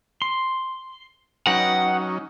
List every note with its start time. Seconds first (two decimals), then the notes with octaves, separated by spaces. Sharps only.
0.22 C6
1.47 F#3 C#4 D#4 B4 D#5 F#5 G5